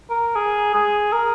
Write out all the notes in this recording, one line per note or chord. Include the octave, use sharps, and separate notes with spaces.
A#4
G#4
G#4
A#4